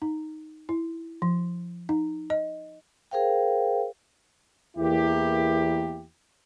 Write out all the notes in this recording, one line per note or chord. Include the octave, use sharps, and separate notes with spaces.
D#4
E4
F3
D#4
D#5
G#4 A#4 C5 F5 G5
E2 A#3 E4 G4